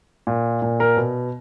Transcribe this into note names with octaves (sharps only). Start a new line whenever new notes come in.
A#2
A#2
A#4
B2